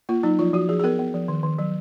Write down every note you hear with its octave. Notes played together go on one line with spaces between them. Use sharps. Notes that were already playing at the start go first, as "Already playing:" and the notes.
A#3 F4
F#3 D#4
F3 F4
F3 F#4
F3 G#4
G#4
B3 A#4
B3
F3
D#3
D#3
F#3